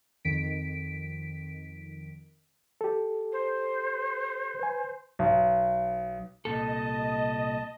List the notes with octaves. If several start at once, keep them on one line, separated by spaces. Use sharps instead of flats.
F2 D#3 B6 D7
G4 A4
C5
B4 G#5
B1
C2 A#2 A4 D#5 A5